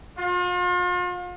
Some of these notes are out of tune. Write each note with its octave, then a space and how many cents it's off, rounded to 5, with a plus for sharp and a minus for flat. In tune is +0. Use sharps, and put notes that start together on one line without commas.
F4 +40